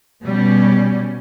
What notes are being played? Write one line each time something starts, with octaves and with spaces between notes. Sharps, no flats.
B2 G3 C#4